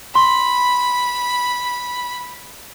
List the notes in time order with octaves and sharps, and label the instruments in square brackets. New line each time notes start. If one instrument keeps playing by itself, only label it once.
[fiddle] B5 [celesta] C6